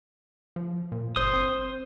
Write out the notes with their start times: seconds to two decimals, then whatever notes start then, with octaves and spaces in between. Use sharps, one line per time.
0.56 F3
0.92 A#2
1.16 G1 C5 D#6
1.33 C4